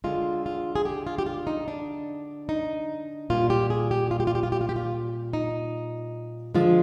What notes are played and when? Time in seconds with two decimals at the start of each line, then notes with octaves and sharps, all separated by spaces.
0.04 D3 G#3 F4
0.46 F4
0.76 G#4
0.85 G4
1.07 F4
1.18 G4
1.26 F4
1.47 D#4
1.68 D4
2.49 D#4
3.30 A#2 G3 F4
3.50 G4
3.70 G#4
3.91 G4
4.11 F4
4.20 G4
4.27 F4
4.35 G4
4.43 F4
4.52 G4
4.61 F4
4.69 G4
4.76 F4
5.33 D#4
6.55 D3 F3 G#3 F4